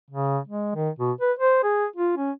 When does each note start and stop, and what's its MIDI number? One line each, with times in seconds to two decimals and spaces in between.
0.10 0.39 49
0.48 0.73 56
0.75 0.90 51
0.99 1.12 47
1.21 1.32 71
1.39 1.59 72
1.64 1.86 68
1.96 2.14 65
2.17 2.31 61